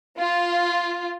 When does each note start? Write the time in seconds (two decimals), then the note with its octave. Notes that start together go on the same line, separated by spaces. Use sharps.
0.17 F4